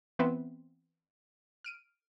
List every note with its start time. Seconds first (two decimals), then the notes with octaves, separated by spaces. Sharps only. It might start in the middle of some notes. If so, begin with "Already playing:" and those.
0.19 E3 B3 C4 B4 E5
1.64 F6 D7 D#7